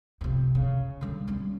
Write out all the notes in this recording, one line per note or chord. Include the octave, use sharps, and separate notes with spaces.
F2 C3
C#3
D3 G3
G3 C#4